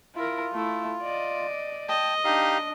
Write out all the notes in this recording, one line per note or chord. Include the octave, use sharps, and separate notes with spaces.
E4 F4 A#4
A3 E4
D5 D#5
D#5 G5 A5
D4 D#4 G4 F5